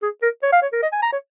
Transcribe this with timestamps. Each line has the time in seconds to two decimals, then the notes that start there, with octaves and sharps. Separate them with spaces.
0.03 G#4
0.23 A#4
0.43 C#5
0.52 F5
0.62 C#5
0.73 A#4
0.83 D#5
0.93 G#5
1.02 A#5
1.12 C#5